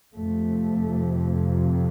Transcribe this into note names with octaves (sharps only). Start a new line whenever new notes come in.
F2 C3 A3